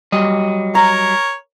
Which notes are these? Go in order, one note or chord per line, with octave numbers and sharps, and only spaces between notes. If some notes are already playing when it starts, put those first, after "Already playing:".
F#3 G3 D#5
A#4 C#5 A#5